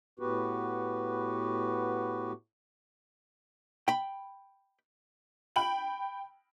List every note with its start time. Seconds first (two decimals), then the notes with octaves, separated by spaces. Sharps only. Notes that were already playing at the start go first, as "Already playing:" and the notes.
0.19 A2 B3 F#4 G4 B4
3.88 G5 B5
5.56 G5 B5 F#7